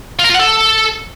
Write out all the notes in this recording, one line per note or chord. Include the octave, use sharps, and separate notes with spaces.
F4
A#4
F4
F#5
A4